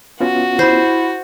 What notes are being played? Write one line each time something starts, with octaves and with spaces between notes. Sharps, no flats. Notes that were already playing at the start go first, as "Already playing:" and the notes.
B3 C#4 F4 F#4
E4 C5